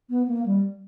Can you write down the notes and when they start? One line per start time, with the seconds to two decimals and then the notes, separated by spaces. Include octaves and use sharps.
0.09 B3
0.27 A#3
0.45 G3